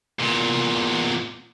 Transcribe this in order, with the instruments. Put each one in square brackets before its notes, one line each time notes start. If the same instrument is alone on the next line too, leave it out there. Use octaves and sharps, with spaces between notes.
[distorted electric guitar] E2 A#2